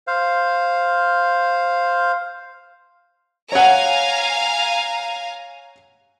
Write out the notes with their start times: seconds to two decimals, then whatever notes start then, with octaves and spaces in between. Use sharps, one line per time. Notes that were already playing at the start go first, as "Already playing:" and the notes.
0.07 C5 F5
3.52 C#5 F5 F#5 G#5 A#5